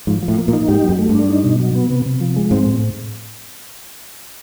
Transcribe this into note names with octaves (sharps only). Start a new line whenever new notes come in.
G#2 F3
F3
A2
A#3
A#2
D#4
G#2 G4
F#2 F#3
A3
G2
D4
D#4
B2
F#3
B3
C3
C3
F3
G#3
G#2 C4
A2